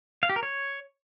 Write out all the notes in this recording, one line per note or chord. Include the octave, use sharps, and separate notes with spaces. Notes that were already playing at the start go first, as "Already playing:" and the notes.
F5
G4
A#4
C#5